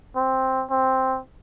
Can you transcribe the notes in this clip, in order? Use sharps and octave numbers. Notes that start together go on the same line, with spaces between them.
C4
C4